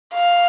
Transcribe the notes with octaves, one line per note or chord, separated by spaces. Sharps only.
F5